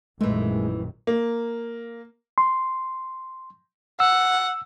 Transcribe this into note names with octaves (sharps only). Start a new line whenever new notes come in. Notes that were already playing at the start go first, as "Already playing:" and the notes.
A#1 F#2 D#3 E3 G#3 A3
A#3
C6
F#5 E6